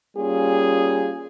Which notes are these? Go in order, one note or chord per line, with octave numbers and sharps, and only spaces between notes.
G3 A#3 C#4 F4 G#4